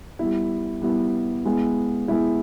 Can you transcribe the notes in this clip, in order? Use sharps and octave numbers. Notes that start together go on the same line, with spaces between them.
G3 B3 E4
G3 B3 E4
G#3 B3 E4
G#3 B3 E4